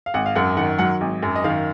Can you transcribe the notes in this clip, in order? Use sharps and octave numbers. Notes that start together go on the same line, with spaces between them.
F5
G#1 F#5
F5
F#2 F#5
D#3 F#5
F#3 F#5
G#1
F#2
D#5
D#3 F5